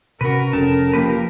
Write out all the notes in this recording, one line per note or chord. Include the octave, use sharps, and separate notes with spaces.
C3 C#4 F#4 A#4 B4
F1 C#4 A4 A5
F3 A#3 G4 B4